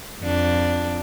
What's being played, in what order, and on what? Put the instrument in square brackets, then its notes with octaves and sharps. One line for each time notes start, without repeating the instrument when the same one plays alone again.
[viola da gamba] F2 D4